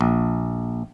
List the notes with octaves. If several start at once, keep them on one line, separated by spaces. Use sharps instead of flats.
A#1